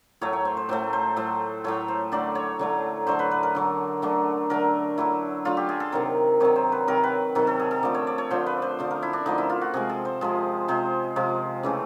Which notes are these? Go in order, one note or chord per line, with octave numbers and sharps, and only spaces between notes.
A2 F#3 A3 C#5
C#5
C5
C5
A2 F#3 A3 C5
C5
A2 F#3 A3 C5
A2 F#3 A3 C#5
C5
D3 F#3 A3 D5
C#5
D3 F#3 A3 C#5
D3 F#3 A3 C5
B4
B4
A#4
D3 F#3 A3
D3 F#3 A3
D3 F#3 A3 A#4
D3 F#3 A3 E4
D3 F#3 A3 F4
G4
G#4
A4
C3 D#3 F#3 A#4
C3 D#3 F#3 C#5
C5
B4
C3 D#3 F#3 A#4
B4
C3 D#3 F#3 A4
A4
G#4
A4
D3 F3 A3 D5
C#5
D5
C#5
D3 F3 A3 C5
B4
C5
D3 F3 A3
A#4
E4
D4
D3 F3 A3 D#4
E4
F4
F#4
C3 F3 G#3 G#4
A4
C5
C3 F3 G#3
C3 F3 G#3 C5
C3 F3 G#3
C#3 E3 A3